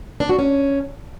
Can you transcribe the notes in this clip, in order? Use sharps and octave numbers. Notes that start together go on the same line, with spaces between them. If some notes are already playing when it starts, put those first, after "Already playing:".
D4
F#4
C#4